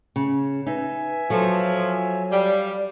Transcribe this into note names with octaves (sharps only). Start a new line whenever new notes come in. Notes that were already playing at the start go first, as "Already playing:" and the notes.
C#3
D#4 B4 E5 G#5
F3 F#3 A4
G3 D5 F5